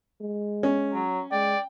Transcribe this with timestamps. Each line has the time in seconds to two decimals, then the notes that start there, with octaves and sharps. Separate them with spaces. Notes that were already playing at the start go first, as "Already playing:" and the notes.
0.21 G#3
0.63 C#4
0.94 F#3
1.32 G#3 D5 G5